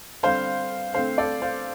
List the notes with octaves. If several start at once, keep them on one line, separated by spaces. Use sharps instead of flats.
D3 G3 C4 C5 F5
D3 A3 C4 C5 F5
A4 D5
C5 F5